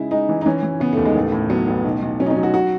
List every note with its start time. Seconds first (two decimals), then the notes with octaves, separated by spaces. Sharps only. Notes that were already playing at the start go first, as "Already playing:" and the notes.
Already playing: C#3 G#3 E4
0.11 G#3 D#4
0.29 E3
0.41 D#4
0.46 E3 C#4
0.63 E3
0.80 C#3 B3
0.93 D#2 A3
1.05 G#3
1.15 A1 A3
1.32 A2
1.49 F#3 B3
1.68 A1
1.84 B1
2.02 B1
2.20 F#3 C#4
2.26 D#4
2.30 C#4
2.37 F#3
2.43 F#4
2.54 F#4